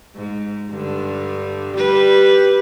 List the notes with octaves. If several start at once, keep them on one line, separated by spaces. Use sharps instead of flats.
G#2
G2 D3
G3 G4 B4